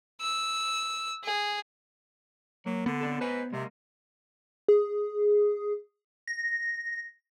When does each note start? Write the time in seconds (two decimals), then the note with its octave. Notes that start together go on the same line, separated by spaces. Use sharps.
0.21 E6
1.25 G#4
2.66 F#3 A#3
2.86 D3 B3
3.01 C4 D4 A4
3.21 B4 C5 D#5 G#5
3.53 C3 G#3 A#3 D#5
4.68 G#4
6.27 A#6